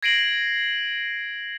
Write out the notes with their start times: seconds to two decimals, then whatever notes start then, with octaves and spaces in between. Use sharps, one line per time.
0.03 G#6 A#6 C7 D7 D#7 F#7